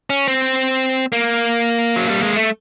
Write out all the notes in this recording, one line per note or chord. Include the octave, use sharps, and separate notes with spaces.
C#4
C4
A#3
F#3
G3
G#3
A3